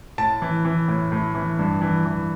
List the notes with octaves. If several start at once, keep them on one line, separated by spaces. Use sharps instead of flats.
A2 A5
E3
E3
A2
A2
E3
G2
E3
E3